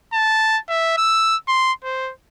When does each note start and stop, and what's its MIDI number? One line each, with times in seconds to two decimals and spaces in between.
0.13 0.58 81
0.69 0.97 76
0.97 1.36 88
1.48 1.72 84
1.84 2.11 72